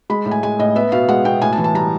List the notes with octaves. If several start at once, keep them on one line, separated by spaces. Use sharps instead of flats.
G#3 B5
A2
G#5
G#3 G#5
A2 D#5
B3 E5
B2 F5
G#3 F#5
B2 G5
A2 G#5
A5
E3
A5
G3 A#5